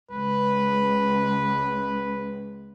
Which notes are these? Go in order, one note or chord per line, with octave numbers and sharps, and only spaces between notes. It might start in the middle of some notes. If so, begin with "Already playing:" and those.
C#2 B4